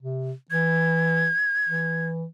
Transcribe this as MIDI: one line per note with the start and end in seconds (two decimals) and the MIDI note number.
0.02 0.32 48
0.51 1.30 52
0.51 2.06 92
1.69 2.25 52